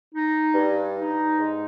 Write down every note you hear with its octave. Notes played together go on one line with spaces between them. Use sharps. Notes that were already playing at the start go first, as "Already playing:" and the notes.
D#4
G2
D#4
G#2